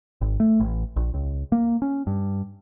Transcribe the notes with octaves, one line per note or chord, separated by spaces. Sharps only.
G#1
A3
A1
A#1
C#2
A#3
C#4
G2